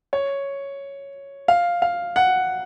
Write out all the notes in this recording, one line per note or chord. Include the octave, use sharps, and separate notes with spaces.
C#5
F5
F5
F#5